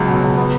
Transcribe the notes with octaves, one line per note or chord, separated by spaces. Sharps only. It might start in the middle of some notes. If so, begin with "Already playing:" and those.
Already playing: C#2 F#3
B2
C#2
B3